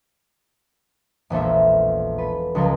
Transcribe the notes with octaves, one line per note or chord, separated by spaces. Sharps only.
E1 A#1 A4 E5
A4 B4
C#2 F3 A4 A#4